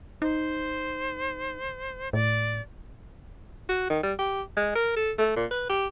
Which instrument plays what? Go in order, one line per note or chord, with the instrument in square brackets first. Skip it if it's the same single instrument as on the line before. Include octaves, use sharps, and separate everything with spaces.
[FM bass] D#4 [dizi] C5
[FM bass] A2 [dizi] D5
[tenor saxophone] F#4
D#3
G3
G4
G#3
A#4
A4
A3
A#2
B4
G4